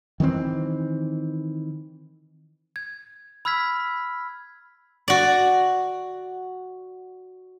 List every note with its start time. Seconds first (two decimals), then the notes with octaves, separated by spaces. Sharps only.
0.20 D#3 E3 A3 C4
2.76 G#6
3.45 B5 E6 F6 G#6 B6
5.08 F#4 D5